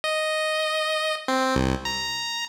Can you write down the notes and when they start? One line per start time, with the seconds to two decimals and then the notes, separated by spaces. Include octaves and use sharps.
0.04 D#5
1.28 C4
1.56 C2
1.85 A#5